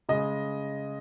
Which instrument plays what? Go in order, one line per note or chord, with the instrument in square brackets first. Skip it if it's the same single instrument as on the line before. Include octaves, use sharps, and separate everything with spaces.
[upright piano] C#3 G#3 D#5